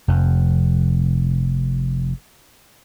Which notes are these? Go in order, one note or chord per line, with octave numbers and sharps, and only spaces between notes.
F1 F2